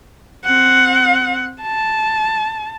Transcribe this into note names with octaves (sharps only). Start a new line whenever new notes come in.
C4 F#5
A5